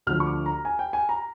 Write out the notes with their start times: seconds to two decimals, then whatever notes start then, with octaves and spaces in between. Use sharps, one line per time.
0.07 D2 D3 F3 F6
0.20 C#6
0.26 D6
0.46 A#5
0.65 G#5
0.79 G5
0.93 G#5
1.09 A#5